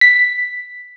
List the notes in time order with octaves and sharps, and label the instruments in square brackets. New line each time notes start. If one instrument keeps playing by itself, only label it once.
[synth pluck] B6